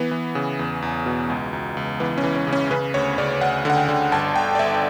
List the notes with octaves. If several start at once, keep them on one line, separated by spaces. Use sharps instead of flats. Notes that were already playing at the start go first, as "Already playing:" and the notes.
Already playing: E3 B3
E3
C#3
E2
E2
B2
C#2
C#2
C#2
E3 B3
C#4
E3
C#4
C#3
C#4
C#3 B4
D2 C#5
C#3 D5
D2 F#5
D3 F#5
G5
D3
G1 A5
G1 G5
D5
G1 E5